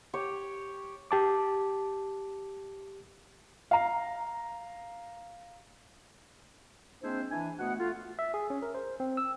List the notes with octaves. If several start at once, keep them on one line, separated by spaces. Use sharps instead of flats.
G4 C#5
G4 A5 D6
F5 A#5
G#3 A#3 C4 D4 E4 C5
E3 D4 G#5
B2 A3 B3 F#4 F#5
A3 F4
E5
G#4
C#4
A#4
C5
C4
E6